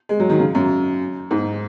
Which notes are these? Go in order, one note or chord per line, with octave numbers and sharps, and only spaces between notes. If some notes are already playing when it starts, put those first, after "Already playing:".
G#3
F#3
D#3
C#3
F#2
G#2